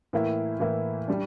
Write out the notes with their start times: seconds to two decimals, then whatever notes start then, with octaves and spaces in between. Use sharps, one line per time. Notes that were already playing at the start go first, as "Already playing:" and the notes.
0.13 A2 E3 A#3 E4
0.60 A2 E3 A#3 E4
1.08 G3 D4